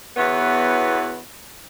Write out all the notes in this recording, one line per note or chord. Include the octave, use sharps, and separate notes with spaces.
E2 E3 B3 F#4 C#5